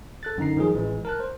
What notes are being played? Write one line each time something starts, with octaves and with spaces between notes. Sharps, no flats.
A4 F#6 A6
F#2 D3 D#4 A#5 C7
D#3 F3 G#3 G#4
A1 E3 G#3
A#4 A5 F#6
C5